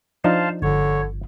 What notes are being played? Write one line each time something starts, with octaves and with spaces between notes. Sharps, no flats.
F3 D4 D#4 C5 F5 A5
G1 D3 C#5